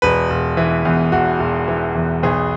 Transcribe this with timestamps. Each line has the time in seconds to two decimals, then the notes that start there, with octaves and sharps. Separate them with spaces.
0.02 E1 B4
0.30 E1
0.57 E3
0.85 E2
1.12 E1 F#4
1.40 E1
1.68 E3
1.95 E2
2.23 B1 G#4